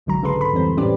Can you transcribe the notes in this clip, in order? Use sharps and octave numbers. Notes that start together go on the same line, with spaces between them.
G1 C2 G#2 D3 F#3 A#5
C#3 G#3 A4 B4 C6
G#1 B5
F2 E3 G3 C4 C5
G1 A2 C#4 G4 B4 D5